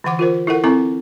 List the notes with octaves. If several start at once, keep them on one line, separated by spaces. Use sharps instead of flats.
D3 E3 F#5 D6
F4 A#4 C5
E4 A4 A#4 F#5
C4 E4 A4 A#5 D6